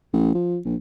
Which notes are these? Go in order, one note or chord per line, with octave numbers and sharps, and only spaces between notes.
A1
F3
A#1